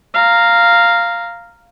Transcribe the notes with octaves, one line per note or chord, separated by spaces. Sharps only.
F5 A#5